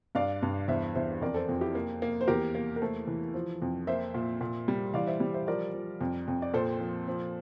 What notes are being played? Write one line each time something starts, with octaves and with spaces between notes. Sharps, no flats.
G2 D5 F5
G2
E2 C5 E5
E2 C5 E5
F2 A#4 D5
A4 C5
F2 F4
E4 G4
A#3
A#3
C5
E2 G4 A#4
A#3
A#4
A3 A4 C5
E3
F3
F2
A#3 C5 E5
A#2
A#2
G3
E3 D5 F5
C5 E5
G3
C5 E5
F3 A#4 D5
F3
F2
F2
D5
A#2 A4 C5
F3
F3